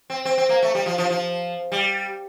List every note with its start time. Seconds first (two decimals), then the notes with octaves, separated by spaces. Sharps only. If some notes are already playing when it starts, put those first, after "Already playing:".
0.10 C4
0.25 C4
0.38 C4
0.49 A#3
0.63 A3
0.75 G3
0.86 F3
0.98 F3
1.10 F3
1.72 G3